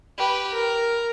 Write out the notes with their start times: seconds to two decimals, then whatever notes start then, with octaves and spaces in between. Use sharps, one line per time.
0.18 G4 B4
0.55 A#4